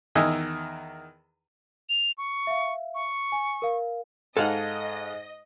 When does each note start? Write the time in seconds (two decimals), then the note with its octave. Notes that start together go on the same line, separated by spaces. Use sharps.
0.15 E2 D#3 D#5 G#5 E6
1.89 F7
2.18 C#6
2.47 E5 F5
2.95 C#6
3.32 G#5
3.62 A#4 F5
4.37 G#2 A4 D#5 F5 F#5